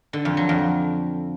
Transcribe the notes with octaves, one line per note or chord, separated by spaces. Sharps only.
D3
F2
F#3
F2